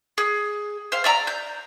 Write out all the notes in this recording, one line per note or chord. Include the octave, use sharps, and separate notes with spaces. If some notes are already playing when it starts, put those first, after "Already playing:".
G#4
C5 F5
D5 E5 A#5 E6
G6